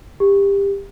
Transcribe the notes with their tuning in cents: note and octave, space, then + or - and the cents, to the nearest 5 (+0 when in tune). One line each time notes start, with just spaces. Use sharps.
G4 +25